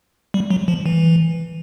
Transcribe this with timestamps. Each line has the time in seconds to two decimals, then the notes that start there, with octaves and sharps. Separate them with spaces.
0.34 G3
0.51 F#3
0.68 F3
0.86 E3